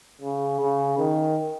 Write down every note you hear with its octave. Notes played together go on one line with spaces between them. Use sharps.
C#3
C#3
D#3